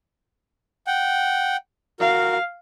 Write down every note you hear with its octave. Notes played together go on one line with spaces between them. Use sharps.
F#5 G5
F#4 A#4 F5